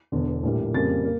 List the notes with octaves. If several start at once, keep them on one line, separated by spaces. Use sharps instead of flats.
E1 E2 D3
A#1 A2 G3 A#3
F2 C#3 G3 A#3 A6
A#3